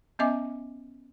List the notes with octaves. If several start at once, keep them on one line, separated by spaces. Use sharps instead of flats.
B3 C#4 D#5 E5 G#5 D6